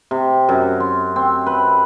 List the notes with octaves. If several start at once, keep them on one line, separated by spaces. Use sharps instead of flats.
C3
F#2
C6
C4
B4